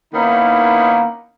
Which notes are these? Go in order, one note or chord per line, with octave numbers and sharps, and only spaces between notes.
D#3 A#3 B3 C#4 D#4 E4